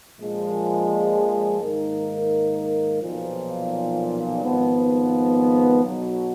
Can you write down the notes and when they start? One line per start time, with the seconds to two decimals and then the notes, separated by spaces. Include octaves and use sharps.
0.19 A#1 A#2 F3 G#3
1.60 G#2 D#3 A#3 D#4 A#4
3.02 B1 A#2 F3
4.42 G#1 G#2 F3 B3
5.84 B1 B2 F#3